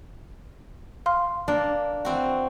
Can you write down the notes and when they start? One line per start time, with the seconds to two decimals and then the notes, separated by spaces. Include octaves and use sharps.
1.06 F5 C6 F6
1.48 A#3 D4
2.05 E3 C4 F#4